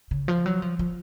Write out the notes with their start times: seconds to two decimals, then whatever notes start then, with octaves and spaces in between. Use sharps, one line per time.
0.11 C#3
0.28 F3
0.46 F#3
0.62 F3
0.79 F3